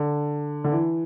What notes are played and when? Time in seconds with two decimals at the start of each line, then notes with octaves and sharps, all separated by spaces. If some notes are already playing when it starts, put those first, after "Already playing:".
Already playing: D3
0.64 D3
0.72 E3